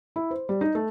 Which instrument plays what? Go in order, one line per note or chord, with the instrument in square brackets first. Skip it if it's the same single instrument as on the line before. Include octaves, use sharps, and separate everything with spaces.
[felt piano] E4
C5
G3
D#4
A3